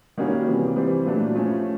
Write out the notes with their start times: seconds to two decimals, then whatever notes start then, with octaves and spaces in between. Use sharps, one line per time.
0.18 D#3 G3 A#3 C#4 F#4
0.46 C3 E3 G3 A#3
0.76 C3 E3 G3 C4
1.05 A#2 F#3 A3 D4
1.34 F3 A3 C#4